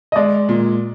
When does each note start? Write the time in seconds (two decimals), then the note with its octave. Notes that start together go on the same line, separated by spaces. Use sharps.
0.12 D#5
0.16 G#3 D5
0.49 A#2